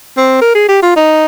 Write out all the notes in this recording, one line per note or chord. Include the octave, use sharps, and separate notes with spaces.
C4
A#4
G#4
G4
F4
D#4